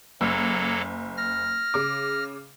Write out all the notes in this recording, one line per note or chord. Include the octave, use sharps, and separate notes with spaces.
F#1 F#3 A#3 A4 E6
F6 A#6
C#3 D6